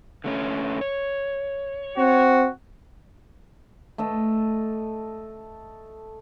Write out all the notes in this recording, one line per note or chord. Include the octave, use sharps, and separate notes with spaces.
D3 A3 C#4
C#5
C4 F#4
A3 A4 D#5